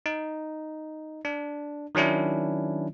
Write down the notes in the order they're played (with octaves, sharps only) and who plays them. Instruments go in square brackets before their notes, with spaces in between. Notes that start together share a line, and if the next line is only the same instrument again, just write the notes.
[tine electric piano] D#4
D4
D#3 F#3 C#4 D4 E4